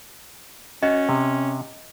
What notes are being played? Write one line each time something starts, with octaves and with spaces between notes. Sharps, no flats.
C#4 F#4 D#5
C3